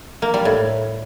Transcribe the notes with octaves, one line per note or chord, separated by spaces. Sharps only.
A#3
G3
A2